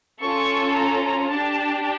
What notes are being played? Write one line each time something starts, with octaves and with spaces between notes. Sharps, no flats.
C#4 F4 A4 C#6
A#5
D4 G4 A5